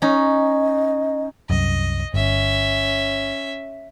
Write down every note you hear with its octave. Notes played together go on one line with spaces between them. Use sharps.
C#4 D#4 D#5
C2 F#2 D#5
G1 C#4 E5